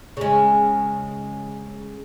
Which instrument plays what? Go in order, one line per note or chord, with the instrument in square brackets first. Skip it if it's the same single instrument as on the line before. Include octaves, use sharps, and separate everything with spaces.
[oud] C#3 G#3